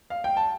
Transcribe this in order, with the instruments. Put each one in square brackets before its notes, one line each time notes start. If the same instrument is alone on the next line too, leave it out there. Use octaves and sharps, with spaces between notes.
[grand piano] F5
G5
A5